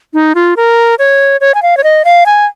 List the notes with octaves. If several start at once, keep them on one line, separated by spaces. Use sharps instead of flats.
D#4
F4
A#4
C#5
C#5
G#5
F5
C#5
D#5
F5
G#5